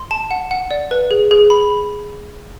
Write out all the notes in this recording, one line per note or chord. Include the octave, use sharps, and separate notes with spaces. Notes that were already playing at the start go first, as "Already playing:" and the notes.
Already playing: C6
A5
F#5
F#5
D5
B4
G#4
G#4
B5